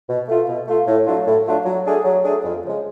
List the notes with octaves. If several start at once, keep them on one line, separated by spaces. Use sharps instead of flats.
B2
A3 F4
B2
A3 F4
A2
F#3 A3 D4 F4
A2
F#3 A3 D4 F4
F#3
A3 D4 G#4
F#3
A3 D4 G#4
F2
C#3 F3 G#3